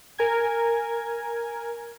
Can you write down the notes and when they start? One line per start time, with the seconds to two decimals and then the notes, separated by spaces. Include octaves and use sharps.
0.18 A#4 G#5 G#6